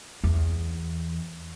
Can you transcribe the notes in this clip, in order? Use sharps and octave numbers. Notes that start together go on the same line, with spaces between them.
E2